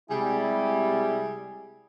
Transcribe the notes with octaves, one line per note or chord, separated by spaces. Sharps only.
C3 G3 G#3 E4 G#4